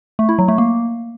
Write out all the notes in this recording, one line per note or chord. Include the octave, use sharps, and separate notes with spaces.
A3
E4
F#3
A3
A#3